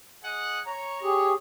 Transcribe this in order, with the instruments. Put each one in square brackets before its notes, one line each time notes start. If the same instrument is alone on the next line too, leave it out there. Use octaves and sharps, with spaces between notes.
[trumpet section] G#4 D#5 F#5
[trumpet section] C#5 [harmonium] A#5
[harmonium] G4 G#4